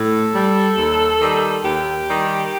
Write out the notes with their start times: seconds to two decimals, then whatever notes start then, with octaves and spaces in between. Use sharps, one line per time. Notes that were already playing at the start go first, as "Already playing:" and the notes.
Already playing: A2 A4
0.34 G3
0.77 D#2
1.21 D#3 G3
1.64 D#2 G4
2.08 D#3 G3